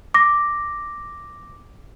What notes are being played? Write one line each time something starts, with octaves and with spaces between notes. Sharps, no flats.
D6 A#6